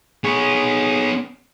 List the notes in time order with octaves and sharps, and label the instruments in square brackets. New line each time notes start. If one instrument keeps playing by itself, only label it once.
[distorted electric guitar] B3 C#5 [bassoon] G#4